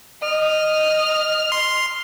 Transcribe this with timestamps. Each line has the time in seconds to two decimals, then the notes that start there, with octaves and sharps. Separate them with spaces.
0.22 D#5 F6
1.52 C6